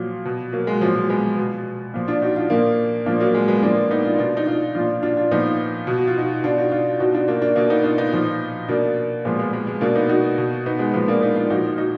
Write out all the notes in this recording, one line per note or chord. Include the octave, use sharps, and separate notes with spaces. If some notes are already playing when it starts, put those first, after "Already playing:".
Already playing: A#2 F3 F#3
B2
F#3 A#3
G#3
A#2 F3 F#3
G#3
G#3 B3
B2
A#2 F3
D4 F4
D#4 F#4
D4 F4
A#2 F3 A#3 D4
A#2 F3 A#3 D4
F#3 A#3
G#3
G#3 B3
A#2 F3 A#3 D4
B3 D#4
D4 F4
B2 D4 F4
D#4
D4 F4
A#2 F3 D4 F4
D4 F4
D4 F4
A#2 F3 B3 D#4
B2
F#4
F4
D#4 F#4
B2 D4 F4
D#4 F#4
D4 F4
B2 D#4 F#4
D4 F4
A#3 D4
A#3 D4
B2 A#3 D4
B3 D#4
D4 F4
B3 D#4
A#2 F3
B2 A#3 D4
A#2 F3 G#3 B3
G#3 B3
G#3
G#3
B2 A#3 D4
B3 D#4
D#4 F#4
B2
B3 D#4
G#3 B3
A#2 F3 G#3 B3
A#3 D4
B3 D#4
D4 F4
A#2 F3 D#4 F#4
D#4 F#4